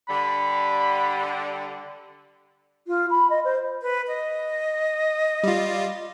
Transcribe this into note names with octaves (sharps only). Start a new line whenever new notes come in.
D3 G3 B5
F4
B5
D#5
C5
B4
D#5
G3 F4